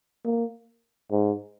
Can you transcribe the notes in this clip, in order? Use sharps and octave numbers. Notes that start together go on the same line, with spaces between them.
A#3
G#2